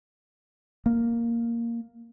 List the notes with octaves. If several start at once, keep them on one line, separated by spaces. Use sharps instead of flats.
A#3